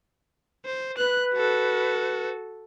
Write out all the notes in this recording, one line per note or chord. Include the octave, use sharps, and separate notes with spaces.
C5
B4 F#6
F#4 A4